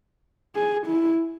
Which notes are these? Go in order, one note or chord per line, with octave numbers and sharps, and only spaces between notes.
G#4
E4